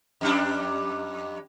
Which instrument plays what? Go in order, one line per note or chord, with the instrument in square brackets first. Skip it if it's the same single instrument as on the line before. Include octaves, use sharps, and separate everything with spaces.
[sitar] F2 G3 D4